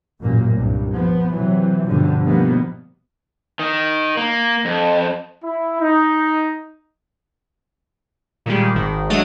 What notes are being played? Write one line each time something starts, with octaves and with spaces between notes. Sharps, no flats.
A1 F#2 A#2 A#3
C2 G2
F3 B3
C3 E3 F#3
G2 B2 D3 F3 G3
B2 D#3 F3 G3 A#3 B3
D#3
A#3
F2
E4
D#4
A#2 D#3 G3 G#3
G#1 D#3
F#3 G#3 A3 D4 D#5